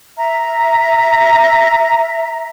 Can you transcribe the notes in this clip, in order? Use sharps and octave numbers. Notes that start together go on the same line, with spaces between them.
E5 A#5